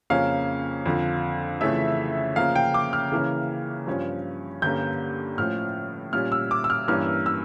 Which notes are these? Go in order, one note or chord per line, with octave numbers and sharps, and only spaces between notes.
F2 C#3 F3 A#3 C#4 F5
F2 D3 F3
F2 C#3 E3 A3 C#4 E5
C#3 F3 A#3 C#4 F5
G5
D6
F6
C#3 E3 A#3 C#4
G2 F3 C#4
G2 D3 G3 A#3 C#4 G6
A2 F3 C#4 F6
A#2 G3 C#4 F6
E6
D6
E6
F6
G2 E3 A#3 C#4 F6
E6